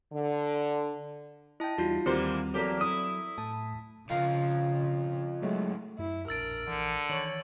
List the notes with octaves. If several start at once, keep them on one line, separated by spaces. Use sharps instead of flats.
D3
E4 D#5 G5 A5
E2 G3 D#4 F4 F#4
D#2 E3 G3 A#3 C4 C5
E2 F#3 A#3 G4 A4
E4 D#6
A2 A5
F2 C#3 F3 A#4 F5 A5
C#2 F#2 F#3 G#3 A3
F#2 E4
E1 A#1 D4 A#4 E6 A6 D7
A#1 D3 E3
D#3 E3 C#5 F#7